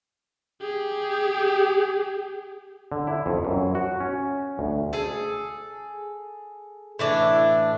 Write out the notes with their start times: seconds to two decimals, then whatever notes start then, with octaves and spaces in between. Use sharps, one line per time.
0.61 G4 G#4
2.92 D3
3.07 E4
3.26 F2
3.45 F#2
3.75 F#4
4.00 C#4
4.59 D2
4.93 G#4 A4
6.99 A2 E3 D4